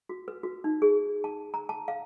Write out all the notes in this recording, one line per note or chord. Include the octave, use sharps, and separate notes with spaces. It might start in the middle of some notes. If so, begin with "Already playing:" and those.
F#4
B4
F#4
D#4
G#4
A5
A#5
A5
F5